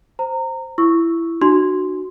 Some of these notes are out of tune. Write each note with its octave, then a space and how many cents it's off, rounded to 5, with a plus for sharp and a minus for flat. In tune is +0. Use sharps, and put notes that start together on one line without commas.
C5 +0 A#5 -25
E4 +15 C#6 +0 E6 +0
D4 +45 F#4 +0 C6 +0